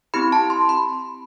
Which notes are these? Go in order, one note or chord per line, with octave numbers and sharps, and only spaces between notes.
C4 E4 G4 B5
A5
C6
B5